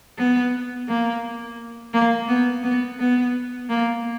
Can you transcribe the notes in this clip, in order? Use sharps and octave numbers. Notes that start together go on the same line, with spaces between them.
B3
A#3
A#3
B3
B3
B3
A#3